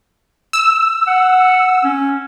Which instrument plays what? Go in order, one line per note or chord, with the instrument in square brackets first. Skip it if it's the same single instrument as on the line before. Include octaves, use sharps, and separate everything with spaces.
[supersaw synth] E6
[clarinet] F#5
C#4